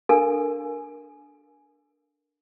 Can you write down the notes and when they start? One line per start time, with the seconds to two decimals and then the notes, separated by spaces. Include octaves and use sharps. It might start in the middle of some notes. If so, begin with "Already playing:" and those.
0.09 D4 A4 A#4 F5 G#5